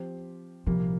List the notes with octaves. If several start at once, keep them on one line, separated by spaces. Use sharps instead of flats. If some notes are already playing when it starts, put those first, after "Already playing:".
Already playing: F3 C4 G4 C5
C2 A#2 F3 G3 A#3